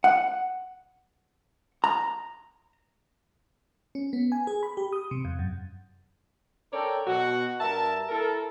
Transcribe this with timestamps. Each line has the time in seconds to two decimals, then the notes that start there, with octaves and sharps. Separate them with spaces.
0.04 F#5
1.84 A#5
3.95 C#4
4.13 B3
4.32 G#5
4.47 G#4
4.63 B5
4.77 G4
4.93 D#6
5.11 C3
5.25 F2
5.39 F#2
6.72 A4 A#4 C#5 D5 G5
7.07 B2 F#4
7.60 G2 A#4 E5 A5
8.09 E4 A4 A#4